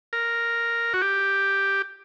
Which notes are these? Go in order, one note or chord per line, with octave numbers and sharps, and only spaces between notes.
A#4
F#4
G4